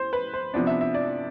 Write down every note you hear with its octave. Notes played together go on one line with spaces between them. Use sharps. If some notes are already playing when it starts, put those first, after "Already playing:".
Already playing: C5
B4
C5
C3 F3 B3 D4
E5
E5
D5